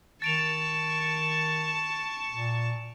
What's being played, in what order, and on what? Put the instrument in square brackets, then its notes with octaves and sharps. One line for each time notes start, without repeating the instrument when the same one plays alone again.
[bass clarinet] D#3 [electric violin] A5 C#6 [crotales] A6 D7 F7
[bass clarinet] A#2